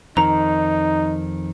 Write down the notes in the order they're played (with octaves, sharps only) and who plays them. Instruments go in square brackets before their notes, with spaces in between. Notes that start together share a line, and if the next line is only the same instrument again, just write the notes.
[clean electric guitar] F2 D#3 [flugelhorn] D#4 [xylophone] A#5